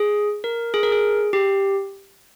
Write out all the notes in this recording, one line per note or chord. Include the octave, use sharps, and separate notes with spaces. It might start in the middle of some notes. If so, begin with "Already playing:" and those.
Already playing: G#4
A#4
G#4
A#4
G#4
G4